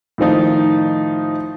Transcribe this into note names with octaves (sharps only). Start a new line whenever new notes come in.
A2 D#3 F3 D#4